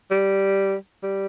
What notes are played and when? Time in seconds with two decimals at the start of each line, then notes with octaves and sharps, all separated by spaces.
0.11 G3
1.03 G3